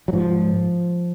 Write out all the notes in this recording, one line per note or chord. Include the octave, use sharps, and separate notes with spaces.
F#3
G#2 F3